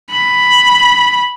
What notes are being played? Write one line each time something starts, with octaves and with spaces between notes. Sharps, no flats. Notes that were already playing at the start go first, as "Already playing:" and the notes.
B5